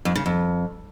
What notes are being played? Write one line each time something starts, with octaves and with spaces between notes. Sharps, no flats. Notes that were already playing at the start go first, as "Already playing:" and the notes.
F2
C#3
F2